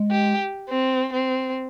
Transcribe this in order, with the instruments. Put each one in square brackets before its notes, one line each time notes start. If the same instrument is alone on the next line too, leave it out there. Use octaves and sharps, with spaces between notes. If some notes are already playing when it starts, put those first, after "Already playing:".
Already playing: [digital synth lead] G#3
[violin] G4
C4
C4